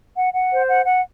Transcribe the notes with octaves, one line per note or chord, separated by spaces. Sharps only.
F#5
F#5
C5
F#5
F#5